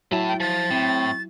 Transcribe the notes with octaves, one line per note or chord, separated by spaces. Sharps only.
A2 F#3 E4 A5
G5
F3 A6
A2 C4